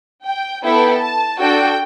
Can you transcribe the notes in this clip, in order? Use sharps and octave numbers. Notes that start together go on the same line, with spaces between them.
G5
B3 E4 A4 G5
A5
D4 F#4 A4 G5